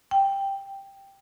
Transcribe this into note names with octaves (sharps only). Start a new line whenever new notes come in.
G5